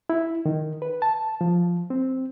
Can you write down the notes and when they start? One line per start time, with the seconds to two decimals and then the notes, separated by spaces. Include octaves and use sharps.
0.10 E4
0.46 D#3
0.82 B4
1.02 A5
1.41 F3
1.90 C4